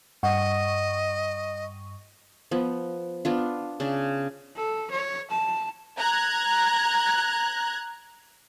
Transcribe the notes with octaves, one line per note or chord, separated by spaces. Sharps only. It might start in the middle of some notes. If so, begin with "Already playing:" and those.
G2 D#5 F#5 C#6
F3 B3
B3 D4 F4
C#3 D4
A4
C#5
A5
A#5 F#6 G#6